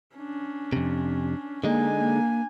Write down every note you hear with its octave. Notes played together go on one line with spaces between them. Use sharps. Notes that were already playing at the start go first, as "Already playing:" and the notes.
C#4 D4
F2 C3
D3 G#3 A#3 D4 D#4 G#5
A#3